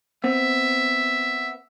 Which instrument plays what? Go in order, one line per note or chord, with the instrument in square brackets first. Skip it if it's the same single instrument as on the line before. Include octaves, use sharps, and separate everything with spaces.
[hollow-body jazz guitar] B3 C4 [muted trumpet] E5